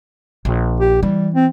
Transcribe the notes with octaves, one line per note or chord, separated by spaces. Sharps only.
A#1
G4
E3 G3
C4